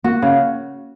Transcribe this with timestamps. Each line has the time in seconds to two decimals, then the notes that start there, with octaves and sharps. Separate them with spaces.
0.04 A#3 F#4
0.22 C#3